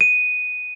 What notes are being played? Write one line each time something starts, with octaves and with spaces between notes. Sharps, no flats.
D#7